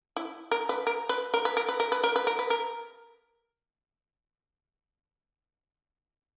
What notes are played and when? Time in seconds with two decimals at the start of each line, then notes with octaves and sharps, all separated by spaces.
0.16 E4
0.51 A#4
0.69 B4
0.87 A#4
1.09 B4
1.34 A#4
1.45 B4
1.57 A#4
1.69 B4
1.80 A#4
1.92 B4
2.04 A#4
2.16 B4
2.27 A#4
2.39 B4
2.50 A#4